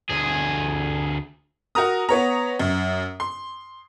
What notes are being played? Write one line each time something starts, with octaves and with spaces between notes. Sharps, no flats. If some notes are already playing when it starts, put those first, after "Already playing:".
D2 G#4
F#4 A#4 A#5 D#6
B3 C#5 A#5
F#2
C6